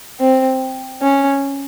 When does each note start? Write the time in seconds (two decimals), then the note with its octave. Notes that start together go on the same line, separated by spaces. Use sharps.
0.19 C4
1.02 C#4